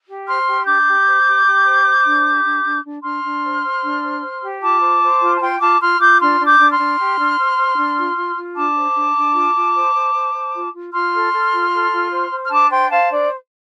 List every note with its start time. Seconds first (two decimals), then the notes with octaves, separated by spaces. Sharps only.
0.08 G4
0.27 C5 C6 F6
0.47 G4
0.66 D4 D6 G6
0.87 G4
1.07 C5
1.27 G4
1.46 G4
1.66 C5
1.85 C5
2.05 D4
2.25 G4
2.44 D4
2.64 D4
2.84 D4
3.03 D4 C6 F6
3.23 D4
3.43 C5
3.63 C5
3.83 D4
4.02 C5
4.22 C5
4.42 G4
4.62 F4 A5 D6
4.81 C5
5.02 C5
5.21 F4
5.36 A5
5.40 F4 G5 C6
5.60 F4 A5 D6
5.80 F4 C6 F6
6.00 F4 D6 G6
6.20 D4 C6 F6
6.40 D4
6.46 D6 G6
6.59 D4
6.72 C6 F6
6.79 D4
6.99 G4
7.18 D4
7.38 C5
7.57 C5
7.78 D4
7.98 F4
8.16 F4
8.36 F4
8.56 D4 A5 D6
8.76 C5
8.96 D4
9.16 D4
9.35 F4
9.55 F4
9.75 C5
9.95 C5
10.15 C5
10.34 C5
10.54 F4
10.73 F4
10.93 F4 C6 F6
11.14 A4
11.33 A4
11.52 F4
11.73 A4
11.91 F4
12.12 C5
12.31 C5
12.46 F6
12.51 D4 A5 D6
12.70 C5 G5 C6
12.90 C5 F5 A5
13.10 D4 D5